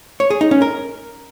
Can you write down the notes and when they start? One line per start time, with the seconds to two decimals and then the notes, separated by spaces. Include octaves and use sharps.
0.20 C#5
0.30 G#4
0.41 D#4
0.51 C#4
0.62 A#4